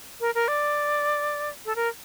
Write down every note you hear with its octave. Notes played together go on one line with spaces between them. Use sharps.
A#4
A#4
D5
A4
A#4